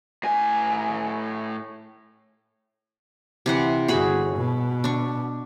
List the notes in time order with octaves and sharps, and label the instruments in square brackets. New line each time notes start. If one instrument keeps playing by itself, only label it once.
[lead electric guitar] A2 G#5
[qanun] C3 E3 F#5
[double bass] G1 [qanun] F#4 G#4 B5
[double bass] B2
[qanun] D4 C#6